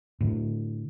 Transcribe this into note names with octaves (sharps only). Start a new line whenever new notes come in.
A2 D3